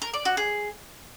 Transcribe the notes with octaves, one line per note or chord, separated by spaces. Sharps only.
A#4
D5
F#4
G#4